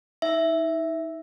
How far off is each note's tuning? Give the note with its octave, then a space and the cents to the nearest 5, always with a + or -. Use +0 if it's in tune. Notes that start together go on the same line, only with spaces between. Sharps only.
D#4 +30 E5 +0